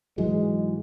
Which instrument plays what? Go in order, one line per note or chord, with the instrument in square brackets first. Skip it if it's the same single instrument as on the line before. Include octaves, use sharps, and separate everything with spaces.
[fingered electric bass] G#2 E3 F#3 [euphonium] G#3